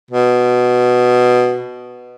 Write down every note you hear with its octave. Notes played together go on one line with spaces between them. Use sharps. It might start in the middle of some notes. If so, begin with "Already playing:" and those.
B2